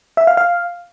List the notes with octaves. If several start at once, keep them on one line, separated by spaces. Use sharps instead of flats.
E5
F5
F5